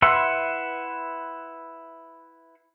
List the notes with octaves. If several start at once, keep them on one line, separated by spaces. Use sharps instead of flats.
E4 B4 E5 F#5 C6